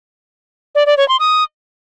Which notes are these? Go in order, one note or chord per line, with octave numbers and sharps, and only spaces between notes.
D5
D5
C#5
C6
D#6